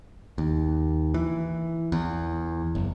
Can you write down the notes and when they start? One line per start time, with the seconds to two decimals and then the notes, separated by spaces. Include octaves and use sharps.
0.38 D#2
1.14 E3
1.92 E2
2.75 F#1